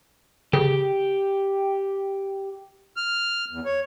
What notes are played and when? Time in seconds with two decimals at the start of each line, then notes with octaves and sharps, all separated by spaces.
0.53 C#3 G4
2.97 F6
3.51 E2
3.65 C#5